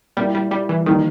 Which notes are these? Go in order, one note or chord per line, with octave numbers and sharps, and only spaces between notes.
A#2 G3 A#3 E4 A#4
G3
G3
E3
D#3 G3 A#3 D#4